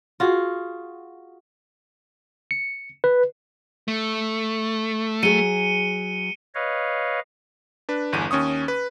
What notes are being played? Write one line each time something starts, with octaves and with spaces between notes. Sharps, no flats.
F4 F#4 G#4
C#7
B4
A3
F#3 G#4 C#7 D#7 G7
B4 C#5 D#5 F5
D4 B4
G1 E2 D#7
D#2 C#4 C#6 D#6
B4